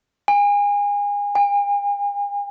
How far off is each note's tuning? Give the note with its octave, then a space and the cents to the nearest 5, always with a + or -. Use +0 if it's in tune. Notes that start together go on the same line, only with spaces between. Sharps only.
G#5 -30
G#5 -45